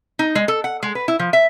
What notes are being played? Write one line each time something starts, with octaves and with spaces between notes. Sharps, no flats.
D#4
G#3
A4
F#5
G#3
B4
E4
F3
E5